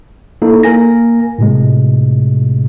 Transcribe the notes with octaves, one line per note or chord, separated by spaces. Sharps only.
A#3 D#4 E4 A4
A#3 A#4 G#5 A#6
A2 C3 G#3